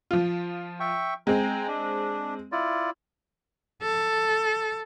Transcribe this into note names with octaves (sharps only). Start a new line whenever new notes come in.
F3 F4
E5 G5 C#6
G#3 C4 G5 G#5 A#5
D4
E4 F4 D5
A4